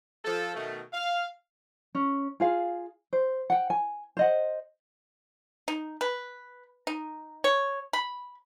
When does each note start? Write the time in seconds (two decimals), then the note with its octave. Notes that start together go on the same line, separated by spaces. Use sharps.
0.25 F3 A4
0.55 B2 D#3 A3
0.93 F5
1.95 C#4
2.40 F4 G#4 F5
3.13 C5
3.50 F#5 G5
3.70 G#5
4.17 C5 D#5 F#5
5.68 D#4
6.01 B4
6.87 D#4
7.44 C#5
7.93 B5